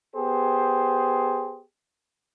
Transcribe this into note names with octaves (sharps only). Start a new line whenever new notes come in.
B3 G4 G#4 C5